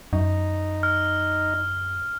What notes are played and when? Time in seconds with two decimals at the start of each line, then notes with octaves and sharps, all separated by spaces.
0.13 F#2 D#4
0.83 F6